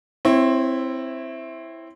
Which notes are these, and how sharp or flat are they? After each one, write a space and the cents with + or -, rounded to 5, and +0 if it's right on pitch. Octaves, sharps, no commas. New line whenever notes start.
C4 +0 E4 +0 C#5 -25